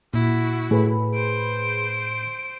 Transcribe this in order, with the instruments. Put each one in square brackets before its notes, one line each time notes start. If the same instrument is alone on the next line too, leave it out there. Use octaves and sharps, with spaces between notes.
[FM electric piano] A#2 [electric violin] E4 F#4
[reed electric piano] A2 [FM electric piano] G#4 B4 B5
[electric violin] C5 D7